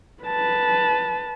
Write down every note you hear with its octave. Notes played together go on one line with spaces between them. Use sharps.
B4 A5